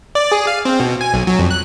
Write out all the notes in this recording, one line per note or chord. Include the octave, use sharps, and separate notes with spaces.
D5
G#4
F5
C4
B2
G#5
B1
F#3
F2
F#6